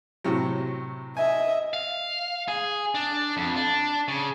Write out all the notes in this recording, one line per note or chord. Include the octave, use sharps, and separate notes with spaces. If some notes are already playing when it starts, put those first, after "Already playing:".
A2 C3 F#3
D#5 E5 G#5
F5
G#4
D4
F2
D4
C#3